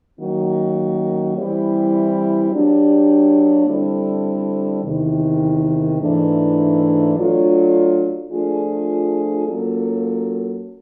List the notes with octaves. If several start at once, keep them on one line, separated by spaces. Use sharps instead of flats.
D#3 F#3 A#3 C#4 F#4
E3 G3 C4 E4 G4
F#3 A#3 D4 G4
D3 G3 C4 E4 A4
E2 C3 D#3
G#2 E3 A3 D4
F#3 A3 D4 F4
F3 A3 D4 F4 G#4
F#3 A#3 C#4 F4 A4